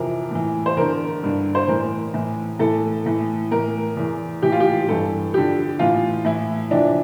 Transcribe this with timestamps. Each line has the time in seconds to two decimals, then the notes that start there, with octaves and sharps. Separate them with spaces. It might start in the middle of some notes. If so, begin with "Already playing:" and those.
Already playing: F2 C3 E3 A#4
0.31 A2 E3
0.66 C5
0.77 E2 D3 A#4
1.23 G2 D3
1.55 C5
1.68 A2 E3 A#4
2.14 A2 E3
2.59 A2 E3 A4
3.06 A2 E3
3.51 A2 E3 A#4
3.97 E2 E3
4.42 A2 E3 G4
4.52 F4
4.60 G4
4.89 G2 E3 A4
5.34 F2 D3 G4
5.79 A2 E3 F4
6.25 A2 E3 E4
6.71 F2 C3 E3 D4